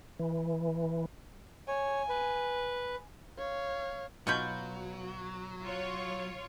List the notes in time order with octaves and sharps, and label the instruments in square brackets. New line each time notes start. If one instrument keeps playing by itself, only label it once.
[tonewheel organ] E3
[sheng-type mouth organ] C#5 [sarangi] G#5
[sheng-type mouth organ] B4
[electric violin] C#5 F5
[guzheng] B2 F4 B5 [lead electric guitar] F#3 [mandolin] C#6 G6
[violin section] F4 C#5